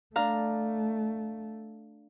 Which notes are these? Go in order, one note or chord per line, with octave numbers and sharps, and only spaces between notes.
A3 D4 F5 A#5